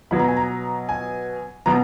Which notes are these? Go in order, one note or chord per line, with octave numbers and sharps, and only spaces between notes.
B2 F#3 B3 B5
A#5
G#5
A#5
G#5
B2 F#3 B3 A#5